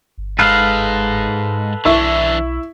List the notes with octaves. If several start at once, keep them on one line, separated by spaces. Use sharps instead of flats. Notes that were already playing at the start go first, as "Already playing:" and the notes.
G1
G#2 G#3 A4 B4 F5
B1 E3 D4 E4 C#6